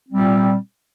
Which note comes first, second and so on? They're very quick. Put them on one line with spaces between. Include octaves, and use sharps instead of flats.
C4 G3 A#2